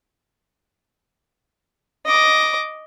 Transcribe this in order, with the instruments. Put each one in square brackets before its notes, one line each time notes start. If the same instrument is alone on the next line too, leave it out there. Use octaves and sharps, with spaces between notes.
[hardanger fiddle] D#5 D6